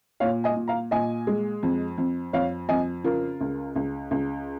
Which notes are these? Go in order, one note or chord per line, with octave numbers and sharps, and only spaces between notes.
A#2 C#5 F5
D#5 G#5
A#2
F5 A#5
A#2 D#5 G#5
G#3
F2
F2
F2 C#5 F5
F2 D#5 G#5
C#3 F4 A#4
C#2
C#2
C#2